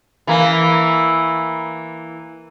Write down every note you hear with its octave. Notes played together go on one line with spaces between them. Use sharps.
E3 A#3